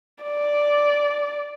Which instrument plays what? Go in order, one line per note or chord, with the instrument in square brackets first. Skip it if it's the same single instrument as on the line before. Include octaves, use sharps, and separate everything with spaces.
[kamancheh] D5